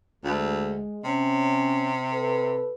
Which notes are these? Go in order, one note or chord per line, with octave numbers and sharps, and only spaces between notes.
D2 G#3
C3 C#4
A4 B4